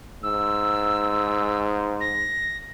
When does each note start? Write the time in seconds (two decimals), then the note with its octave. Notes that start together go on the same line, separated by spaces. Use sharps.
0.23 G#2 E6
2.00 A#6